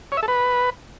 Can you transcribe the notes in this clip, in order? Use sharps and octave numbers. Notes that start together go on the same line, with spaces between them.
C#5
E5
A4
B4